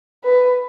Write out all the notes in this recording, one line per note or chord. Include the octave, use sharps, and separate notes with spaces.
B4